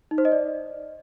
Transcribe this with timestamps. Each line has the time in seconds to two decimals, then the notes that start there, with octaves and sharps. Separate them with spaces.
0.11 D#4
0.18 C5
0.25 D#5
0.32 D5